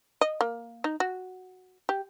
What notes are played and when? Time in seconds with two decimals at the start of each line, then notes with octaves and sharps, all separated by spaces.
0.21 D#5
0.41 A#3
0.84 D#4
1.00 F#4
1.89 G4